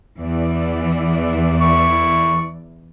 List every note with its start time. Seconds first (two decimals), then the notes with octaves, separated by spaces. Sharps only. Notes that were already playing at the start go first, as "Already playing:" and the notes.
0.20 E2 E3 D5
1.61 E4 C#6